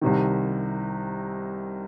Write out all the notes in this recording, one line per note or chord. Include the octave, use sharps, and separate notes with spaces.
C2 C3 D#3